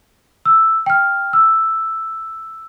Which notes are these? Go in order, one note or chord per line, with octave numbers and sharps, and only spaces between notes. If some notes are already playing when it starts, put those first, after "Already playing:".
E6
G5 F6
E6